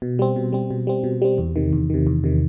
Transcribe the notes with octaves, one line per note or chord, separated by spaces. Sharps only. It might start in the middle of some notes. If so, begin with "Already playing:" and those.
B2
G3 C4
B2
G3 C4
B2
G3 C4
B2
G3 C4
E2
C3 D#3
E2
C3 D#3
E2
C3 D#3